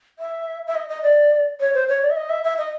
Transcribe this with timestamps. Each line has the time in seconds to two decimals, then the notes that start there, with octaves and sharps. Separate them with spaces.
0.19 E5
0.67 E5
0.75 D#5
0.89 D#5
1.03 D5
1.60 C#5
1.74 C5
1.89 C#5
2.02 D5
2.10 E5
2.17 D#5
2.30 E5
2.44 E5
2.58 D#5